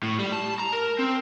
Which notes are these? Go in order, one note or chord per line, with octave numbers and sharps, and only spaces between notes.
A2
G3
A5
A#5
A#4
C4